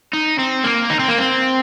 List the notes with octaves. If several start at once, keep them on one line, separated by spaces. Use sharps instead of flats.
D#4
C4
A#3
D#4
C4
A#3
C4